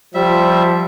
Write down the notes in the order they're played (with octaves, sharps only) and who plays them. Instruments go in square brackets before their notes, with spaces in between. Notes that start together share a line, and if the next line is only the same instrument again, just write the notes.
[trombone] F3 [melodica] G3 E5